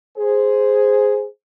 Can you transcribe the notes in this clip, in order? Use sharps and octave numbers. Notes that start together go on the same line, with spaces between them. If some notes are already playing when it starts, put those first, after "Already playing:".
G#4 C5